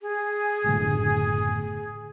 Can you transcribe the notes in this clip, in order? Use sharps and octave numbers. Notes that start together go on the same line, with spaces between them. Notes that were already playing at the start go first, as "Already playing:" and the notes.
G#4
F#1 A2 D3